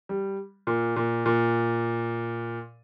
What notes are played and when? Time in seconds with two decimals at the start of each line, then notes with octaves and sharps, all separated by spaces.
0.09 G3
0.67 A#2
0.96 A#2
1.26 A#2